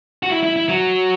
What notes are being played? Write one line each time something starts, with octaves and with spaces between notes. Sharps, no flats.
F#4
E4
E4
E4
F#3